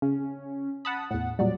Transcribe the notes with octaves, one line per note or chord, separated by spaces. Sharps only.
C#3 C#4
F#5 A5 B5 D#6
E2 A2 F#5
A#2 F#3 G3 D5